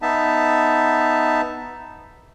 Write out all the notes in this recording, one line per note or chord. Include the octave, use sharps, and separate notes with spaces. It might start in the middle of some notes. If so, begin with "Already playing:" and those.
B3 D#4 E5 A5